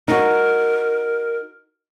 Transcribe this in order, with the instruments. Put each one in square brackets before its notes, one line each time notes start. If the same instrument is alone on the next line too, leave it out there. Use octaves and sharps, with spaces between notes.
[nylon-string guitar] D#4 F#4 [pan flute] A#4